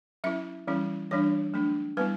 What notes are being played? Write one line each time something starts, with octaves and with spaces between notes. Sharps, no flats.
F#3 C#4 E4 E5
E3 G3 C#4 E4
E3 G3 D4 C#5
F#3 A3 D4
G3 B3 E4 B4